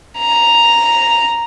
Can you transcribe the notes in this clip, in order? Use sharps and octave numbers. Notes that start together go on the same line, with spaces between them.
A#5